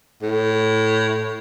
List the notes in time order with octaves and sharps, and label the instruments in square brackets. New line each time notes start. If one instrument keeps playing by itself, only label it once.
[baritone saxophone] A2